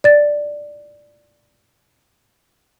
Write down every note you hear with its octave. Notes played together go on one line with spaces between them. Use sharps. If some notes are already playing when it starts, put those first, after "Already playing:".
D5 A6